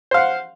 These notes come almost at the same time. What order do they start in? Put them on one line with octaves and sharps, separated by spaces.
C5 F5 F#5